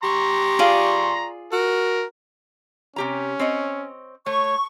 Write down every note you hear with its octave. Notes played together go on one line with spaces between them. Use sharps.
G4 A#5 C6 C#6
F4 G#4 D5
F#4 A#4
C3 C#4 G4 A#5
C4 C#5 D#5
A3 C#5 C#6